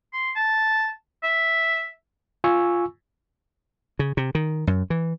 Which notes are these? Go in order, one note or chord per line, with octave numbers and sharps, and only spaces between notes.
C6
A5
E5
F4 G#5 C#6 E6
C#3
C3
D#3
F#2
E3